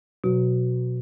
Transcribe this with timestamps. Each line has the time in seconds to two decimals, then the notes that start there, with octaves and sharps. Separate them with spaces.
0.24 B2 F#3